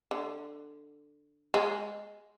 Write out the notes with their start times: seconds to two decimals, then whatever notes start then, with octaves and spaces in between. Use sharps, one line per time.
0.11 D3
1.54 G#3